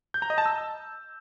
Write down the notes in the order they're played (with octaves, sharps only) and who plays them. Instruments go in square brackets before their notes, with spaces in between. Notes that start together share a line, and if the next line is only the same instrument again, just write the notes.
[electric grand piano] G6
A#5
D#5
A5
E6